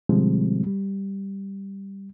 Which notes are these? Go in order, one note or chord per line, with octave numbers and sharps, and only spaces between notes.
B2 D3 F3 G3 G#3 C4
G3